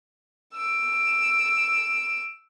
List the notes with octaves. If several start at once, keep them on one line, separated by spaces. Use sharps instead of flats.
E6 D7